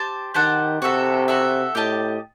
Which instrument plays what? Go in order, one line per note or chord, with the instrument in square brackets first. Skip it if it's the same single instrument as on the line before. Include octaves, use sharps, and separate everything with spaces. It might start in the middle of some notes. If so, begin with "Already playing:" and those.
Already playing: [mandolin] G4 C5 A5
[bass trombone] D#3 [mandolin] G4 C5 F#5 A5
[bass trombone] C3 [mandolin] F#4 A4 E5
[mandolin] F#4 A4 E5
[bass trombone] A2 [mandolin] G4 D#5 A5